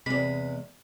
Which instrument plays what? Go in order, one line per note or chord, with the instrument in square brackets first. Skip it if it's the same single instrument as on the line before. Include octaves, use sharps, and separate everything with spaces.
[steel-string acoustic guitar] E2 G#3 [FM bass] C3 [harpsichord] B5